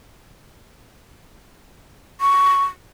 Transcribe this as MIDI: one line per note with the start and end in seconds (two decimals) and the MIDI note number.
2.21 2.64 85